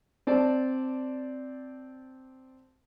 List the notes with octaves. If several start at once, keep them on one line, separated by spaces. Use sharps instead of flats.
C4 D5 A5